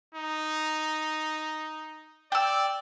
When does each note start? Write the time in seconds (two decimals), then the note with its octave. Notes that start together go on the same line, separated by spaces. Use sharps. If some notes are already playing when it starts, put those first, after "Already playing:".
0.14 D#4
2.32 D5 G5 E6